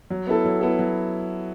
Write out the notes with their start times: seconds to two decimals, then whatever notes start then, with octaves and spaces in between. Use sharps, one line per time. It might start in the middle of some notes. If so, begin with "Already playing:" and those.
0.10 F#3
0.27 B3 E4 A4
0.45 F#3
0.61 B3 E4 A4
0.79 F#3